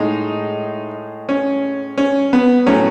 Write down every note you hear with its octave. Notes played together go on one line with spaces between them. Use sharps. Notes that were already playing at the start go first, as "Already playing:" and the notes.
Already playing: A2 G#3 D#4
C#4
C#4
B3
A2 F#3 A3 C#4